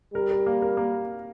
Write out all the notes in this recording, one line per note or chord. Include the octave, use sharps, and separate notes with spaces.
G3 A#4
A#4
A#3
A#4
A#3